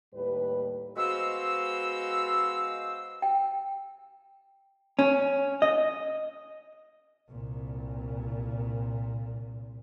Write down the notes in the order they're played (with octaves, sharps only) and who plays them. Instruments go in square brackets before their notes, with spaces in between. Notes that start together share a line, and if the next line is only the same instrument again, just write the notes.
[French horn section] D#2 A2 G3 B4
[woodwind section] G#3 B3 F#4 C5 F5 E6
[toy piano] G5
[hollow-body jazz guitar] C#4
D#5
[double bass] C2 A#2